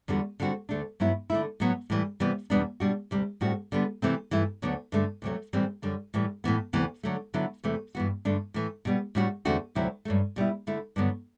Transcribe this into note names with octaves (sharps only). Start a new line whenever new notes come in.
E2 D3 G3 D4 F#4
D3 G3 C4 F#4
D2 D3 A3 D4
G2 F#3 B3 E4
D3 A3 E4
A2 F#3 B3
A2 E3 G3
C3 E3 G3 B3
E2 B2 G3 B3 D4
B2 G3 D4 F#4
D2 C3 G3
A2 G3 C4 F#4
D3 G3 B3
C3 E3 A3 C4
G2 E3 A3 E4
D2 D3 F#3 B3
G2 D3 A3
D2 C3 F#3 A3
A2 E3 G3 C4
F#2 D3 G3 D4
A2 E3 G3
A2 E3 B3
D2 C3 E3 B3
D3 F#3 A3
D3 F#3 B3 E4
E2 C3 E3 A3
G2 E3 B3 F#4
G2 D3 A3 D4
A2 E3 A3
B2 G3 B3
A2 G3 D4 F#4
E2 D3 A3 C4 F#4
D2 C3 F#3 C4 E4
G2 F#3 A3
B2 G3 B3 E4
D3 A3 E4
G2 D3 F#3 B3